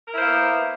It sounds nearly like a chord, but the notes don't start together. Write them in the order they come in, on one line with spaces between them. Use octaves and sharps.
A#4 E4 C5 A#3 B3